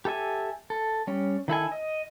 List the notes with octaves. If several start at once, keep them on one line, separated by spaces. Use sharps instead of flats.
G4 A4 E5 G#5
A4
G3 C#4
D#3 E4 A4 G#5
D#5